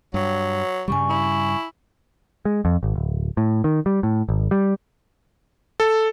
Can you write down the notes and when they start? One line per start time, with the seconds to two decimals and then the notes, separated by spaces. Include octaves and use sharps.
0.14 G2 F#3
0.88 G2 C#3 G3 G#5 C#6
1.09 E4
2.45 G#3
2.65 F2
2.83 G#1
2.96 D1
3.37 A2
3.64 D#3
3.86 G3
4.03 A2
4.29 G#1
4.51 G3
5.80 A4